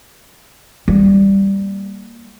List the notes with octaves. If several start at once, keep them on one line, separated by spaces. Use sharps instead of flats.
G3 A#3